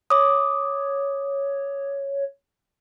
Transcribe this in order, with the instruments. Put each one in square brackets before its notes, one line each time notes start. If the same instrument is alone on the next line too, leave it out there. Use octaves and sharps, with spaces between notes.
[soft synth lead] C#5 [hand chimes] D6 D#6